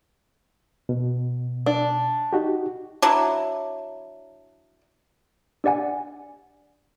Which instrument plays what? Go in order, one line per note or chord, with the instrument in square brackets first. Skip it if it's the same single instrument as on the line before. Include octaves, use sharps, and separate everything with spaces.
[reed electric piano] B2
[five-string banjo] D4
[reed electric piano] D#4 F#4 G4
[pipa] F#3 D4 E4
[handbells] D4 G4 D5 F#5 G#5